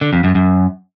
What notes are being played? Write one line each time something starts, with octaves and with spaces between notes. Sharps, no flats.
D3
F2
F#2
F#2